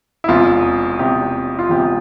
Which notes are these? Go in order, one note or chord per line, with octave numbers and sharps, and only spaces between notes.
E4
E1 E2 C3 F4
E1 E2 C3 G4
F4
E1 E2 C3 G4